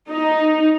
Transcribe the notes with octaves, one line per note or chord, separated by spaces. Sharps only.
D#4